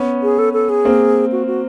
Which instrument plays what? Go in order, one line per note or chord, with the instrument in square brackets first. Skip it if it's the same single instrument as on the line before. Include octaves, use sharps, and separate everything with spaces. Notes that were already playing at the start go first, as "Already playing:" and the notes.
Already playing: [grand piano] B3 C#4
[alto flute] G#4
A4
A4
G#4
[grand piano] A#3 C4
[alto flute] F#4
F#4